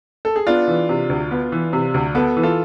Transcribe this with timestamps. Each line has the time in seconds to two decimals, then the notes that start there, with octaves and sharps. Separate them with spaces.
0.25 A4
0.36 G#4
0.47 B3 D4 F4
0.68 E3
0.89 C3
1.09 D2
1.31 B3
1.52 E3
1.73 C3
1.94 D2
2.15 B3 A4
2.37 E3
2.43 F4 A4